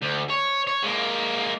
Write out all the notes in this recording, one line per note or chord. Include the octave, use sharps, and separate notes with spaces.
D2
C#5
C#5
G#3 A#3